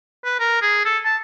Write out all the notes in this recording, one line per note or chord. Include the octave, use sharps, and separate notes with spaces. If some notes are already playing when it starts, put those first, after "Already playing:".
B4
A#4
G#4
A4
A5